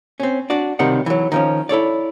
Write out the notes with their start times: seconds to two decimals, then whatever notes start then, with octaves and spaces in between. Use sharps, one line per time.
0.20 C4 C#4
0.50 D4 F#4 D5
0.79 C#2 C3 D#3 G3 F#5
1.06 E3 F#3
1.32 D#3 F3 C#4
1.69 E4 A4 C#5 D5